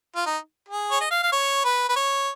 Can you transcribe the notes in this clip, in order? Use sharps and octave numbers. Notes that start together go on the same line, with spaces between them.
F4
D#4
G#4
C#5
D#5
F5
F5
C#5
B4
B4
C#5